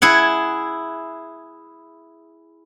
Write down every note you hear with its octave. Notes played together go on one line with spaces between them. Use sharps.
E4 G#4 F#5